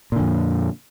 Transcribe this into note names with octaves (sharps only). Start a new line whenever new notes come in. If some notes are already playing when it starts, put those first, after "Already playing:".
F2 A#2 D3